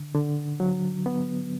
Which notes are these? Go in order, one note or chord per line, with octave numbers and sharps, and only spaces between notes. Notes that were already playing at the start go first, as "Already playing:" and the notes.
Already playing: D3
D3
F#3
B3